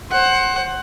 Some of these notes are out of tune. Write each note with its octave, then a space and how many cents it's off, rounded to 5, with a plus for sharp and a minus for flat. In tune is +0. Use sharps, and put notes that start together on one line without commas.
C5 +25 F#5 +15